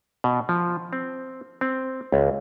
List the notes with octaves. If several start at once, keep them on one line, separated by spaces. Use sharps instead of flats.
B2
F3
C4
C4
C#2